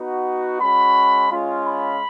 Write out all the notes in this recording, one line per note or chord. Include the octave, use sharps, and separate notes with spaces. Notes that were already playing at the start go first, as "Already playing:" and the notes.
Already playing: B3 D#4 F#4
G#3 C#4 F#4 B5
G#3 C#4 F4
B5